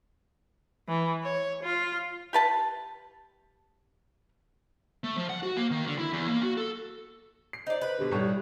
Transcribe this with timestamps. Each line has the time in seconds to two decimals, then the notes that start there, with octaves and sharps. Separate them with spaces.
0.88 E3
1.23 C#5
1.63 F4
2.33 G4 B4 A5
5.04 A3
5.17 F3
5.30 F#5
5.43 F#4
5.57 A#3
5.71 D#3
5.87 D3
5.99 E4
6.13 E2
6.27 A#3
6.43 F#4
6.58 A4
7.53 C7
7.67 D#4 C5 D5
7.81 B4
7.99 B2 D3 G4
8.11 B1 A2 G3 C#5